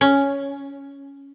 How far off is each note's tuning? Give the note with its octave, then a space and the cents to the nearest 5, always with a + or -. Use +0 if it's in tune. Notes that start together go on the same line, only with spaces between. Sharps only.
C#4 +5